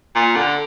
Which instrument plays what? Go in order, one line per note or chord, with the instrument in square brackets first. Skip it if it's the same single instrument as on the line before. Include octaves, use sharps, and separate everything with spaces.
[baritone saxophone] A#2
D3